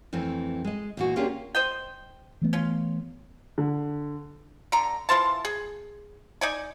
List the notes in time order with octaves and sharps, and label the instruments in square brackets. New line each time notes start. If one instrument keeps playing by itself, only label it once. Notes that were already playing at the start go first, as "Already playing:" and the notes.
[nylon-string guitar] F2 E3 A3 C4
G#3 D#5
E2 A#2 F#4
A#3 C#4 D4 F4 G4 G#4
[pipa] C5 D#5 G5
[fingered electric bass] E3 A3 B3
[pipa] C#4 F4
[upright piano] D3
[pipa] D3 A#5
E3 F4 C5 A5
G#4
D#4 D5 G#5